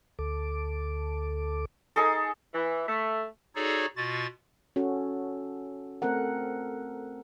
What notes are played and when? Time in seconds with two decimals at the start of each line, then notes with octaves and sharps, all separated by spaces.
0.19 D2 A4 D6
1.96 D#4 G#4 A4
2.54 E3
2.89 A3
3.55 D#4 F#4 G#4 A4 C#5 D5
3.97 B2 F4 F#4 A6
4.76 C#4 F#4 A4
6.02 A3 C4 A4 A#4 F#5